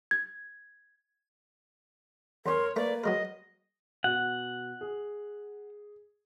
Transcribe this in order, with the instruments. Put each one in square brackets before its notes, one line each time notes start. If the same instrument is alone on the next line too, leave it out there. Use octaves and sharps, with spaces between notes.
[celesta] G#6
[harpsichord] E2 C#4 [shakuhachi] A#4 [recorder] C#5 [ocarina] C6
[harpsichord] A3 A#5 [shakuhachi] A#3 [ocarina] B4 [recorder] D5
[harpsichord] F#3 G#3 A#4 [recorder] D#5
[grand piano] B2 [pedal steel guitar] F#5
[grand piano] G#4